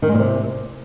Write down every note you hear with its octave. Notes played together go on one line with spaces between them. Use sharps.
D#3
G#3
A#2
C3